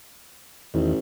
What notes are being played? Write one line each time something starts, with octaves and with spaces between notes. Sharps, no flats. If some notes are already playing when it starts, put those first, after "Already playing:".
A1 E2 D#3